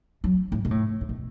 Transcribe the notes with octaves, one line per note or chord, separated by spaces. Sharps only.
F#3
A2
B2
A2
A2
B2